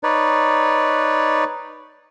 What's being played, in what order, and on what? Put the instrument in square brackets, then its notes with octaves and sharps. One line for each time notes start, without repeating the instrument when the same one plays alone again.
[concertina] D#4 B4 C#5 D5